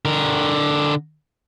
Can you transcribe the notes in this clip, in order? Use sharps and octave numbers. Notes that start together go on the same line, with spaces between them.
D3 A#4